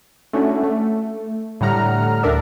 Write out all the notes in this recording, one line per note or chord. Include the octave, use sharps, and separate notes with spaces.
A3 C#4 D4 E4 F#4
A3
A2 D3 G3 F#5 A#5 F6
D2 D4 A#4 D5 E5